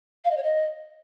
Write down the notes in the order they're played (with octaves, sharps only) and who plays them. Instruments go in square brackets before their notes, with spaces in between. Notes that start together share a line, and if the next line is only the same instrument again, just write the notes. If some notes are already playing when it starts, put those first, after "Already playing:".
[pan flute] F5
D#5
C#5
D#5